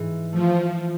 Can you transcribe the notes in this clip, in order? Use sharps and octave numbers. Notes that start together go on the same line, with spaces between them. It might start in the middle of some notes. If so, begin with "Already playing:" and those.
Already playing: G#2 E3
F3 A3